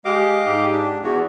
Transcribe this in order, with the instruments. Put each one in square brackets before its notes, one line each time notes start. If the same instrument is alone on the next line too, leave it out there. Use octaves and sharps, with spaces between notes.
[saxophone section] G#3 G4 [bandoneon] D#5 F5 D6
[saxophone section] G#2 G4
[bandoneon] D4
[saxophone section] E2 [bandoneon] F#4